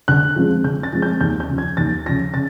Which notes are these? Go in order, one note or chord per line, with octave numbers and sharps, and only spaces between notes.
D3 F#6
F3 G#3 C4
D3 G6
A6
F3 G#3 C4
G6
D#2 G6
G6
C#3 F3
G#6
D#2 A6
C#3 F3 A#6
C#3 A6